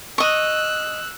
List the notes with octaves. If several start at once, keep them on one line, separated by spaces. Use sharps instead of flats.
D#5 C#6 E6 F#6